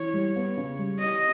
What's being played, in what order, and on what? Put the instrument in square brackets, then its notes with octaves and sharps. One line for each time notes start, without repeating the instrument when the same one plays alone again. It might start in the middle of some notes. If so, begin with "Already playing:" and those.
Already playing: [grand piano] E3 [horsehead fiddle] C#5
[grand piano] G3
B3
C#3
G3
[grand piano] G4 [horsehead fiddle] D#5